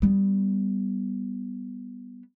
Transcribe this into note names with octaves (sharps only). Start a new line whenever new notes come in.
G3 B3